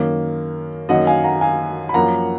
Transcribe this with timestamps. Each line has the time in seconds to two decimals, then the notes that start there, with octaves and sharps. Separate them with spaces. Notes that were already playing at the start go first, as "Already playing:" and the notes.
Already playing: F#2 D#3 A#3
0.89 F#2 D#3 F#3 A#3 D#5 F#5
1.07 F5 G#5
1.24 F#5 A#5
1.41 F5 G#5
1.89 B5
1.94 F#2 F3 A#3 F#5 A#5